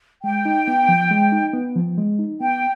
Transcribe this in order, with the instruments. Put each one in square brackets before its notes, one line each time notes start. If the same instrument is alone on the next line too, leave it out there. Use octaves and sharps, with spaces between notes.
[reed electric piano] G#3 [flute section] G5
[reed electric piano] D#4
B3
F3
G#3
D#4
B3
F3
G#3
D#4
[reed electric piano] B3 [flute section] G5